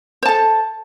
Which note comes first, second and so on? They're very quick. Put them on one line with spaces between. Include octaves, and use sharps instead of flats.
C5 A5 A4